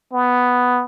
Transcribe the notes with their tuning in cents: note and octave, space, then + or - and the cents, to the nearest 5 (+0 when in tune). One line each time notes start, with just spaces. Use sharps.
B3 +5